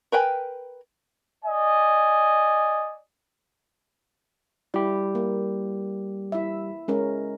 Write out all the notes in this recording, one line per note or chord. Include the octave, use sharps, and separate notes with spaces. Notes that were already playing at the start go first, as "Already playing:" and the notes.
A#4 B4 G5 G#5
D5 D#5 G#5
G3 E4 G4
A#3
E4 E5
G#3 C#4 A#4